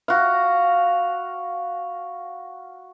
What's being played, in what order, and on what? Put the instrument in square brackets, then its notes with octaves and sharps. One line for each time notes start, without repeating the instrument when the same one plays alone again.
[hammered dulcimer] F#4 F5